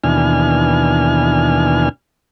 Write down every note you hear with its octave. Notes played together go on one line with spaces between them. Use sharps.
D#2 B2 E3 D4 G#5 F6